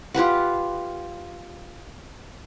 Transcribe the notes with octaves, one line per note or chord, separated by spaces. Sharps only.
F4 G4 B4 F#5